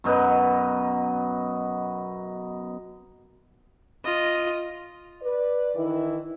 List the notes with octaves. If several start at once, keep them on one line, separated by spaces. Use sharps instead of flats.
F#2 B2 D#4 B4
F4 D#5
B4 D5
D#3 E3 E4